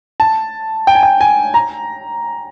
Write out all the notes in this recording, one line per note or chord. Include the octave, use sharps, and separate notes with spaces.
A5
G5
G#5
G5
G#5
A#5